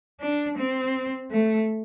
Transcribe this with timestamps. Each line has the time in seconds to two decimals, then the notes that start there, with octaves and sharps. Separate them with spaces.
0.21 D4
0.58 C4
1.31 A3